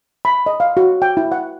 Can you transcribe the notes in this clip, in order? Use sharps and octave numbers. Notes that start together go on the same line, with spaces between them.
B5
D#5
F5
F#4
G5
E4
F#5